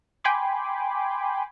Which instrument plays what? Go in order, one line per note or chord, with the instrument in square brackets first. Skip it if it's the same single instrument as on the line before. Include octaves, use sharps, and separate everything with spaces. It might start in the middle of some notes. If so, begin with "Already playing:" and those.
[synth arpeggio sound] G5 G#5 B5 C6 D6